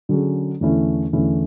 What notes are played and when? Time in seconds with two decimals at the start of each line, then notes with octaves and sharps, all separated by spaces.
0.09 D3 F#3 C#4 G#4
0.61 E2 D3 A3 C#4 E4
1.13 E2 D3 A3 C#4 E4